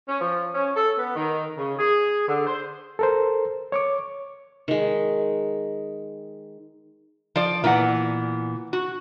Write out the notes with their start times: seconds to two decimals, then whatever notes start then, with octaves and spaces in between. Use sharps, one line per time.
0.08 C#4
0.21 F3
0.55 C#4
0.75 A4
0.98 B3
1.16 D#3
1.58 C#3
1.79 G#4
2.28 D3
2.47 C5
2.99 A4 A#4 C5
3.72 C#5 C#6 D6
4.68 D#3 G#3
7.36 F3 D5
7.64 A#2 E3 B3 F#5
8.73 F#4